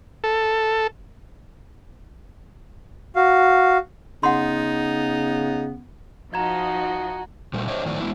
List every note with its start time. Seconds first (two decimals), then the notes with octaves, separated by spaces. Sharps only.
0.24 A4
3.16 F#4 F5
4.23 C#3 B3 D#4 F#5 C6
6.34 F3 D#4 F#4 D#5 A#5 G#6
7.53 A#2 G3 A3
7.68 D4 G4 C5 C#5 D#5 E5
7.85 A2 D#3 F3 F#3 A3 D5
8.00 G#3 B3 E4